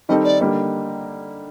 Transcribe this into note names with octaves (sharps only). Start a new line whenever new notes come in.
D#3 G3 C4 D#4 A4 D#5
D5
D3 G3 A#3 D#4